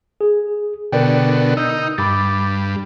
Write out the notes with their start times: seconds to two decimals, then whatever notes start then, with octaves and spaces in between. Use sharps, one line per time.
0.21 G#4
0.92 B2 D3 A#4 D5 G5
1.57 D#4 E6 G6
1.98 G2 B5 D6 A6